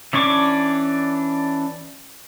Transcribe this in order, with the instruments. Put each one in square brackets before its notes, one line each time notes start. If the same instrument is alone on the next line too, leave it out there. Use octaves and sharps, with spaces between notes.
[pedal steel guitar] E3 C#4 D4 C#6 D6